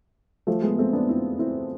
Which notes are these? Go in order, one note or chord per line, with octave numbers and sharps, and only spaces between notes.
F3 A3
G#3 B3
A3 C4
B3 D4
C4 E4
C4 E4